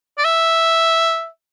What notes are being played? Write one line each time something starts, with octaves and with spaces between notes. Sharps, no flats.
D5
E5